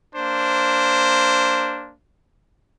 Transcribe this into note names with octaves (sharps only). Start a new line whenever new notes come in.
A#3 D4 C5